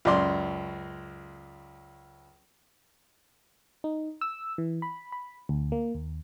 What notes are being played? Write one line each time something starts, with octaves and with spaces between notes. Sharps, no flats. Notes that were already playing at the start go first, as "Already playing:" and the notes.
C#2 F#2 D5 C6
D#4
E6
E3
B5
B5
D2
A#3
D#2